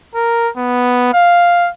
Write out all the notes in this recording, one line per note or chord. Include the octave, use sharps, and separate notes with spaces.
A#4
B3
F5